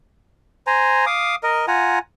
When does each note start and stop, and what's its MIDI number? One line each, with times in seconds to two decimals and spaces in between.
0.67 1.05 72
0.67 1.05 80
0.67 1.05 82
1.06 1.35 77
1.06 1.35 86
1.06 1.35 87
1.43 1.66 70
1.43 1.66 75
1.68 1.99 65
1.68 1.99 78
1.68 1.99 80
1.68 1.99 82